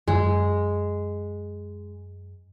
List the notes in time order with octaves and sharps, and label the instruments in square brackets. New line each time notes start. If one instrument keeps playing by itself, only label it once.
[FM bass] F#2 [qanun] G#3